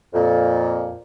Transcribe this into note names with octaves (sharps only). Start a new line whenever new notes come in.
F2 A#2